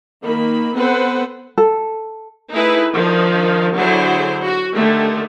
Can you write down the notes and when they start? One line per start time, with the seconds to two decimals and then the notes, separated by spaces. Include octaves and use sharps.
0.23 D#3 A#3 B5
0.77 B3 C4 A4 B4 C5 F#5
1.58 A4
2.52 A3 D#4 E4 G#4 B4
2.94 D#3 F3 D4 D#4
3.74 D3 F#3 E4 G#4 C5
4.43 F#4
4.74 D3 D#3 A3 G4